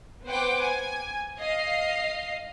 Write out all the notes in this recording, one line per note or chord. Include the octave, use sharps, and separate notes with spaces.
B3 B4 C5 F#5 G5 D6
G#5
D#5 F5 C7